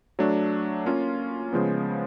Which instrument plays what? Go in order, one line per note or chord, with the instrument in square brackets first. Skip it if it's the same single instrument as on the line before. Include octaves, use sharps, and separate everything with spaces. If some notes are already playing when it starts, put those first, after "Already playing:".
[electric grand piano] F#3 A3 D4
A#3 C#4 F4
C#3 F3 G#3 B3